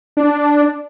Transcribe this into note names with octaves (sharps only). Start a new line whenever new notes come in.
D4